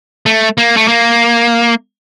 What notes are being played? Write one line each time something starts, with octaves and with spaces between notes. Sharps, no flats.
A3
A#3
A3
A#3